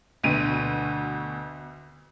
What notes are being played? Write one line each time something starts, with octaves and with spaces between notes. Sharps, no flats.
D2 B2 D#7